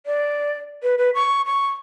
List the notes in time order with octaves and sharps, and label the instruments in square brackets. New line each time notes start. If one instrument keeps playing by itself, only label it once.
[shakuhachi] D5
B4
B4
C#6
C#6